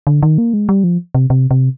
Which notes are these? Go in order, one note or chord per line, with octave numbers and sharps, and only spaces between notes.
D3
D#3
A#3
G#3
G3
F3
C3
C3
C3